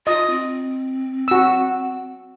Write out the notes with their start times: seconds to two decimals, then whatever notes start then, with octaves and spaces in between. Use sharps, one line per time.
0.07 F4 D#5
0.30 C4
1.28 F#4 E6